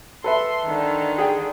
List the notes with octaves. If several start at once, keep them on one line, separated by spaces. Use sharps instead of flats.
A4 B4 E5 C6
D3 D#3
G#4 G5